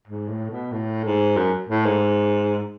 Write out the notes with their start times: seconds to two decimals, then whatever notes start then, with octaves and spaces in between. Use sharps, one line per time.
0.08 G#2
0.29 A2
0.51 B2
0.72 A2
1.05 G#2
1.37 F#2
1.69 A2
1.86 G#2